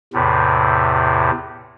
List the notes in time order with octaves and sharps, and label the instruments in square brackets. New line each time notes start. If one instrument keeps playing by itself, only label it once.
[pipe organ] E2 A2 C3